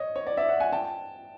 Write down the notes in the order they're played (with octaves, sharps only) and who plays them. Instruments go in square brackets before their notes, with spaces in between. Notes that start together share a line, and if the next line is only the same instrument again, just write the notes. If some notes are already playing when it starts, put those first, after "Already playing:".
Already playing: [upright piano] C#5 D#5
C#5
D5
D5 E5
E5 F#5
F#5 G#5
G5 A5